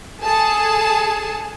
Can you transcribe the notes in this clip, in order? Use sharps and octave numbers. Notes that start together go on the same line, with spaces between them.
G#4 A4 A5